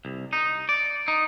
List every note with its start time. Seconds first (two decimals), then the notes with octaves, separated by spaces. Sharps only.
0.05 C2
0.33 D#4
0.69 D5
1.08 D#4